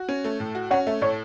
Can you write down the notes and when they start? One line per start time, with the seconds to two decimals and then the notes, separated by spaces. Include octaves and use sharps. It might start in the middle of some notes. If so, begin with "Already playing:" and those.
Already playing: F#4
0.09 C#4
0.24 A3
0.40 A2
0.55 F#4
0.71 C#4 C#5 F#5
0.87 A3 E5
1.02 A2 C#5